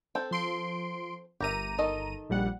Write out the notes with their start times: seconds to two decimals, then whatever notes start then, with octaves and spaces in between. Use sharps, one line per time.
0.15 C4 A4 G5
0.31 F3 C6 D7
1.40 G1 G4 A#4 E5 A#5 D#7
1.79 D#3 A4 D#5
2.30 A#1 G3 F#5